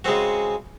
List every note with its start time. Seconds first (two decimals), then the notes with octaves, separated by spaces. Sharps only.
0.04 C#3 G#3 C4 F#4